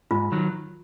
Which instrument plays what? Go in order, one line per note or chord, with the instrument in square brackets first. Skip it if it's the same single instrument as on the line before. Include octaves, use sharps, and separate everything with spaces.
[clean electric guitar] G#2 [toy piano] F4
[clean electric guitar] D#3 F#3